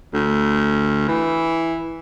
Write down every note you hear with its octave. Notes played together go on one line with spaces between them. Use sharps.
D2
E3